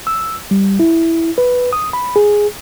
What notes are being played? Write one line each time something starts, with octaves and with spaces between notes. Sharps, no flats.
E6
G3
E4
B4
D#6
B5
G#4